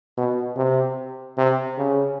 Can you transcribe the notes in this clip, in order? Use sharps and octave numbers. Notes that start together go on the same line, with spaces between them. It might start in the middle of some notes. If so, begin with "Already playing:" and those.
B2
C3
C3
C#3